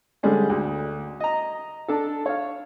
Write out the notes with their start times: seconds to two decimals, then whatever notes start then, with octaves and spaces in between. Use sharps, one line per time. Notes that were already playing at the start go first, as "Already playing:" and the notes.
0.23 D3 G3 G#3 C#4
0.49 D2
1.20 D#5 A#5
1.88 D4 A4
2.26 C#5 F5